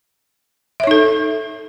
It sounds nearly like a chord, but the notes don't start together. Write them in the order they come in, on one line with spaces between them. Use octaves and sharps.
E5 C#5 D#4 A4